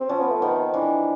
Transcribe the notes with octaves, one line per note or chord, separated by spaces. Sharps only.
C4
F3 C#4
B3
A3
D#3 B3
C4
E3 D4